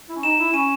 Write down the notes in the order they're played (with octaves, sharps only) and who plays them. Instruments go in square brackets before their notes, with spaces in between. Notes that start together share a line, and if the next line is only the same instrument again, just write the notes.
[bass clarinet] E4
C#4
[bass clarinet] D#4 [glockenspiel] E7
[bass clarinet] E4
[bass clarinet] C#4 [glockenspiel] D#7